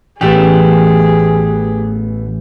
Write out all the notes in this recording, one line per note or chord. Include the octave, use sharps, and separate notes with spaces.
A1 E3 A3 B3 G4 G#4